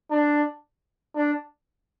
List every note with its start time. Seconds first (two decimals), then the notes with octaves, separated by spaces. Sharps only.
0.11 D4
1.16 D4